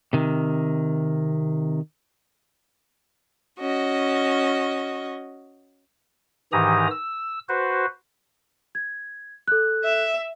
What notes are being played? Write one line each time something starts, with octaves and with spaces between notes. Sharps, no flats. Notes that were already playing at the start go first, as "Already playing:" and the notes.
C3 D#3
C#4 F#4 D#5
G#2 D#3 E3 G4 A#5 D#6
E6
F#4 B4 C5
G#6
A4 F#6
E5